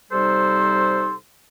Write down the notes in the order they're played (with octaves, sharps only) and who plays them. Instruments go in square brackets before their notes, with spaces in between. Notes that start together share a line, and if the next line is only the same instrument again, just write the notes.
[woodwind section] C3 G3 D#4 A4 C5 C6